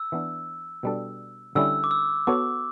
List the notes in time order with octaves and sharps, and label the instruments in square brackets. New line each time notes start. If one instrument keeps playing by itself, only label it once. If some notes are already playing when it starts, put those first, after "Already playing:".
Already playing: [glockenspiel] E6
[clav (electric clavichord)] E3 B3 D4
B2 G3 D4 A4
[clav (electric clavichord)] D3 G3 C#4 E4 [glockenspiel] E6
[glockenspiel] D6
E6
[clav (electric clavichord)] B3 F#4 A4 C#5 [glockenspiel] D6